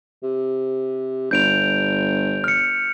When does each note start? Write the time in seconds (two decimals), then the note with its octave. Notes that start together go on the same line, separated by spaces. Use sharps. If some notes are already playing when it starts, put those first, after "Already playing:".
0.23 C3
1.31 G1 G6 D7 F7
2.44 F6 C#7